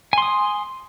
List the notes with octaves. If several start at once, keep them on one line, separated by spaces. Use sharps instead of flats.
G#5 C6 D#6